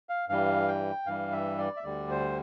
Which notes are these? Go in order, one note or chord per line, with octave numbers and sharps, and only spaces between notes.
F5
G2 E3 G3 F5
G5
G2 E3 G3 F5
E5
D5
E5
D2 D3 G3 D5
C5